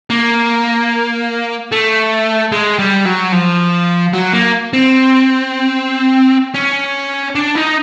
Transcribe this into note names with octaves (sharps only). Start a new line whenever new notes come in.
A#3
A3
G#3
G3
F#3
F3
F#3
A#3
C4
C#4
D4
D#4